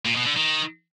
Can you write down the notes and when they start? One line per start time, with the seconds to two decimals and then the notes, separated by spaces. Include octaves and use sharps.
0.06 A#2
0.16 B2
0.27 D3
0.37 D#3